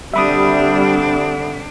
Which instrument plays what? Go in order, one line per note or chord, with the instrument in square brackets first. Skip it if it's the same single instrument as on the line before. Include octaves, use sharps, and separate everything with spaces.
[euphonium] D3 [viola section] G3 [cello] C4 D4 [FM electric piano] E5 B5 D#6